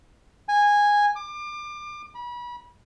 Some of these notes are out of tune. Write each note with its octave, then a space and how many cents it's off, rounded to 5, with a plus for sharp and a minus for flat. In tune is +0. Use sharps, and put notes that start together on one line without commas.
G#5 -10
D6 +30
B5 -35